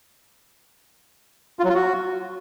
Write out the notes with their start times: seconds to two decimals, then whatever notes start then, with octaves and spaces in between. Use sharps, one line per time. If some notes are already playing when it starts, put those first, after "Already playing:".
1.59 F4
1.64 F#3
1.69 F4
1.74 F#4